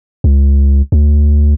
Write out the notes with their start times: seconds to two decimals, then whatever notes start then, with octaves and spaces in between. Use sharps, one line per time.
0.24 C#2
0.92 D2